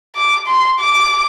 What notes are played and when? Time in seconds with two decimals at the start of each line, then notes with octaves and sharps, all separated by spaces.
0.16 D6
0.47 C6
0.80 D6